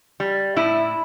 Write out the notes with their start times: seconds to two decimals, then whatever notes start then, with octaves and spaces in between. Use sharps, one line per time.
0.20 G3
0.56 A2 E4